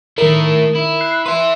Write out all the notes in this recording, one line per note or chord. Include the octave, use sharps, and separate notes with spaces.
D#3 A3 E4 A#4
E4
F#6 C7
B4 E5 C6